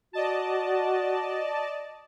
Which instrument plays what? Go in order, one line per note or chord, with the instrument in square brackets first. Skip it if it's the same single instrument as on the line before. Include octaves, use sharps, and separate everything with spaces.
[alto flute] F#4 [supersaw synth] D5 D#5 A5